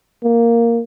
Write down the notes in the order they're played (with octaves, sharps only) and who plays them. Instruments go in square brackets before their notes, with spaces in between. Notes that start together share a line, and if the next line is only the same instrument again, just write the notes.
[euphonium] A#3